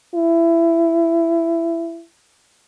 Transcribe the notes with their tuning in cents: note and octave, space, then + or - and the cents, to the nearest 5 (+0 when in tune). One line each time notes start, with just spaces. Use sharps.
E4 +20